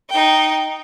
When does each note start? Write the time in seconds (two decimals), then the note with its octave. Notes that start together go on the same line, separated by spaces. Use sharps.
0.10 D#4 G5